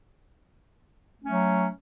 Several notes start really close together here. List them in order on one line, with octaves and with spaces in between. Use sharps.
A3 C#4 F#3